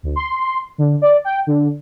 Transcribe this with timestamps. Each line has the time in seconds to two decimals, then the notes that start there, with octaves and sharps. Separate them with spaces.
0.03 D2
0.16 C6
0.78 D3
1.02 D5
1.24 G5
1.47 D3